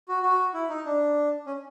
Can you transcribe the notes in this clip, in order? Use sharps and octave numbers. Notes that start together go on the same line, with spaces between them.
F#4
F#4
E4
D#4
D4
C#4